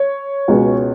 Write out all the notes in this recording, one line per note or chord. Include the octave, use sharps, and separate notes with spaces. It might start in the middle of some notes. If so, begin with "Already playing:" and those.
Already playing: C#5
C#2 B2 G#3 C#4